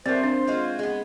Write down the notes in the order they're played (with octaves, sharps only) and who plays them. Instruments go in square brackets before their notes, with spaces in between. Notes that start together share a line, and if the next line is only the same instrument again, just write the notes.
[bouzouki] G3 A3 [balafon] C4 A#4 [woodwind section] C5
[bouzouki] F3 [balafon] D4
[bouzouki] G#3 F4 F#4
G#3 B3